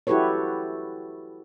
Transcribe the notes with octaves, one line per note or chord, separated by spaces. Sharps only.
E4 F#4 G4 A4 B4 C#5